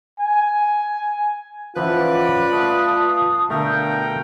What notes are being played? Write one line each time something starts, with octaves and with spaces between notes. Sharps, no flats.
G#5
E3 F3 C#4 F4 B4 D5 F#5
A3 F5 A5 D#6
B2 D3 A3 A#4 F5 G5 G6